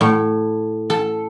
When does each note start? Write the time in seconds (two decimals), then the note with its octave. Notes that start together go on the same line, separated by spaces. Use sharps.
0.01 A2
0.90 A4